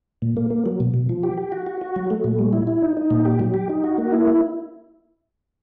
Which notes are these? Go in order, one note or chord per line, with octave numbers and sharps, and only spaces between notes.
A#2
A#3
A#3
F#3
B2
B2
F3
G4
G4
F#4
F#4
F#4
F#3
A3
A#2
G3
E4
E4
D#4
D#4
A#2
G4
F#3
G4
D#4
F#4
A#3
E4